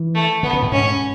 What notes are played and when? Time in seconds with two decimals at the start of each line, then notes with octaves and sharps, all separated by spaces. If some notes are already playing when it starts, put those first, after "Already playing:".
Already playing: E3
0.15 A3
0.43 D3 B3
0.53 C#3
0.63 A2
0.72 G#2 C#4